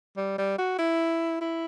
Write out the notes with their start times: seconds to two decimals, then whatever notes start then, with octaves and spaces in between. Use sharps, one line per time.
0.17 G3
0.38 G3
0.58 F#4
0.79 E4
1.41 E4